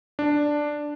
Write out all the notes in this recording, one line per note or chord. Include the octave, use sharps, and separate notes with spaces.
D4